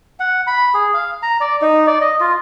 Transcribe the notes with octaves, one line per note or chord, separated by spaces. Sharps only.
F#5
B5
G#4
F5
A#5
D5
D#4
D5
D#5
F4